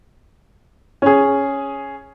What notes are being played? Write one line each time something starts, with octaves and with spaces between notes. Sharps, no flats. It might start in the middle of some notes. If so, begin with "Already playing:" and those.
C#4 G#4